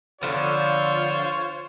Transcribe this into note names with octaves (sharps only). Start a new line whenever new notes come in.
D3 F3 B3 F4 C5 C#5